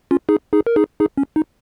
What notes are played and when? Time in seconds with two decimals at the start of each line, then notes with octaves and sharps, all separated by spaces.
0.11 C#4 F4
0.29 D#4 G#4
0.53 D#4 G#4
0.67 A#4
0.76 D#4 G#4
1.00 D#4 G#4
1.18 C#4
1.36 D#4